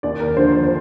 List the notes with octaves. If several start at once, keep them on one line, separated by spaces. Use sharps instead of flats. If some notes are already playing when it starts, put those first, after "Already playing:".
D#2 D5
A#4
D3 F3 C5
C5
C5